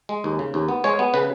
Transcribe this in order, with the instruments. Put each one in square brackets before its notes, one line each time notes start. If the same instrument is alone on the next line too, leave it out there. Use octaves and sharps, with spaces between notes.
[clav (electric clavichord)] G#3
D#2
C#3
D#2
B3
G#3 C#5
B3
C#3 B4